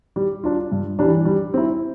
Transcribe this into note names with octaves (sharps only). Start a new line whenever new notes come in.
G3
D4 F4
G2
E3 G3 D4
G3
C4 E4